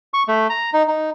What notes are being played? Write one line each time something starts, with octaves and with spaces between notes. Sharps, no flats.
C#6
A3
A#5
D#4
D#4